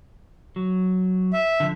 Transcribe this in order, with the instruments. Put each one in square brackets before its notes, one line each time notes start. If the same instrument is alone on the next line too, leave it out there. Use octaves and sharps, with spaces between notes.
[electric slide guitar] F#3
[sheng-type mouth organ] E5
[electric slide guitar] D3 F3